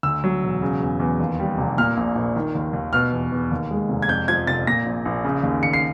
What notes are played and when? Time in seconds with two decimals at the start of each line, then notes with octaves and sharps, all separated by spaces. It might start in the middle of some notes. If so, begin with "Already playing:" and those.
0.03 D2 E6
0.24 F#3
0.43 E1
0.62 C#3
0.81 E2
1.00 E2
1.19 D#2
1.40 G3
1.58 F1
1.78 A#2 F6
1.97 A#1
2.15 A#1
2.36 D#3
2.55 D#2
2.73 D#2
2.93 B2 F6
3.12 E2
3.32 E2
3.52 D#2
3.71 G#3
3.89 F1
4.02 G#6
4.08 F2 G6
4.28 F3 G#6
4.47 F1 A6
4.67 A#2 A#6
4.86 A#1
5.05 A#1
5.24 C#3
5.43 D#2
5.63 D#2 C#7
5.73 C7